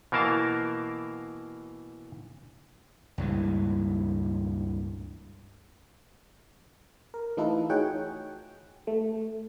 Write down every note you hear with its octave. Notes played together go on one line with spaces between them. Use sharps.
B2 E3 A#3 A#4 F5 A5
C#2 G2 A#2 E3
A#4
E3 A3 D#4 F4 A4 B4
D#4 F#4 G#4 C#5 F#5 G5
A3